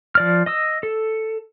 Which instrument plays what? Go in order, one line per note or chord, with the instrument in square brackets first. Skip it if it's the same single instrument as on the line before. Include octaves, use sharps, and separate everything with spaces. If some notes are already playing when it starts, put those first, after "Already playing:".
[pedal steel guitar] F3 D5 F6
D#5 D#6 E6
A4